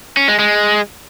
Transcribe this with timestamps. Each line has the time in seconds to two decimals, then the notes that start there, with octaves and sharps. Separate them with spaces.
0.17 C#4
0.28 G#3
0.39 G#3